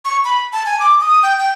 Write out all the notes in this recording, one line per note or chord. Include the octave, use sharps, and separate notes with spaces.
C#6
B5
A5
G#5
D6
D#6
G5
G5